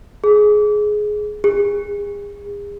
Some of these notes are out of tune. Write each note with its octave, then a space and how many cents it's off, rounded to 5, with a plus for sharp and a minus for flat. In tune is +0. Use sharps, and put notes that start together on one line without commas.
G#4 +15
G#4 -35